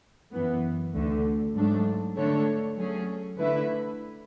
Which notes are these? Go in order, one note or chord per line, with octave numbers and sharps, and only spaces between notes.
F#2 E3 B3
D2 D3 A3
G#2 F#3 A3 D4
D3 A3 D4 A4 C#5
F#3 A3 C#4 G#4
D3 A3 E4 B4 E5